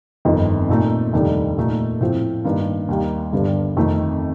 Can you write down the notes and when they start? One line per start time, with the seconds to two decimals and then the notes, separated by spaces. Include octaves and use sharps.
0.25 G1 F2 D#3
0.69 A#2 A3 D#4
1.13 F1 D#2 D#3 G3 D4
1.57 A#2 A3 D#4
2.01 A2 F3 C4
2.44 G2 D#3 A#3
2.88 D#2 D#3 G3 A#3
3.32 G1 G2 D3 G3 D4
3.77 F2 D#3 A3